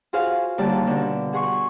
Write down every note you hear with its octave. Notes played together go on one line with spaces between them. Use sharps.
F4 F#4 G#4 C5 F5
D#2 D3 G3 D5 A5
B2 D3
F#4 G#4 F#5 C6 C#6